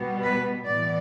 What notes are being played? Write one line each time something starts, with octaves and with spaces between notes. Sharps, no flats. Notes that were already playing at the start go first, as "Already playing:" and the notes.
Already playing: B2 G3 B3
B4
A2 E3 B3 D5